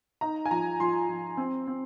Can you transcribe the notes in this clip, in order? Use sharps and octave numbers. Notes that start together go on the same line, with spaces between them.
D#4 A#5
G#5
F3 A#5
F3 C6
F3
C4
C4